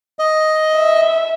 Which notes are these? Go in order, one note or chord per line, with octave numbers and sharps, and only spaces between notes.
D#5
E5